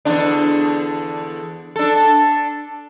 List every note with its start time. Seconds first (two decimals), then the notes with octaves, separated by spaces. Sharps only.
0.05 E2 D3 D4
1.76 D4 A4